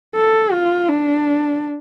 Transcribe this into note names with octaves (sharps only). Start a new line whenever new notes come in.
A4
F4
D4